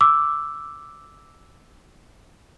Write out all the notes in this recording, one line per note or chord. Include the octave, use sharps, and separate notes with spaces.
D6 E6